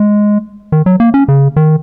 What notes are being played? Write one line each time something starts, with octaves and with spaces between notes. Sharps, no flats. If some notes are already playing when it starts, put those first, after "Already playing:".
Already playing: G#3
D#3
F#3
A#3
C#4
C#3
D#3